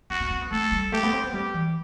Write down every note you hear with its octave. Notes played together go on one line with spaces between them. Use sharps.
C4 F#4
C4
C4
B3
A3 A4
G3
A3 G4
B3
C4
B3
G3 G4
E3